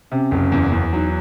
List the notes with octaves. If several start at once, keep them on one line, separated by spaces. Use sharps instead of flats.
C3 C#4
F#1
E2
E2
F#3 D#4